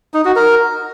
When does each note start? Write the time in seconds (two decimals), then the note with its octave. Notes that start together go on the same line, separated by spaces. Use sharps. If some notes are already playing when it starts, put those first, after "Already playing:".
0.14 D#4
0.25 F#4
0.36 A#4